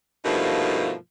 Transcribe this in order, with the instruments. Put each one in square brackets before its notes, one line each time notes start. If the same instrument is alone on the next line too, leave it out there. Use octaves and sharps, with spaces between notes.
[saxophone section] G2 B2 F3 A3 A#3 D#4